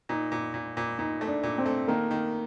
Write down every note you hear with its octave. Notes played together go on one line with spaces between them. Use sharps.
A#2 D#4
A#2
A#2
A#2
A#2 D#4
A3
D4
A#2
C4
A3
D#3 A#3
D#3